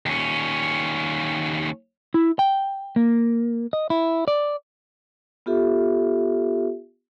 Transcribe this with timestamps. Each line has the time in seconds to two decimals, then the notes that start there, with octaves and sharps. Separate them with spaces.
0.06 D#2 C#4
2.14 E4
2.39 G5
2.96 A#3
3.73 D#5
3.90 E4
4.28 D5
5.46 B3 F4 G4 A4 E5